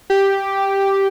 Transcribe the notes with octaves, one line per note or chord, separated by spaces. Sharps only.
G4